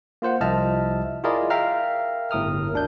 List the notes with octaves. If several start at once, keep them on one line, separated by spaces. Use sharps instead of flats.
A#3 F4 C5 F#5
C2 F3 D#5 E5 A5 F6
E4 F4 G#4 A#4 D5 D#5
A#4 E5 F5 G5 A#5 F6
G1 A2 A#4 D#6 F6
D2 D4 G6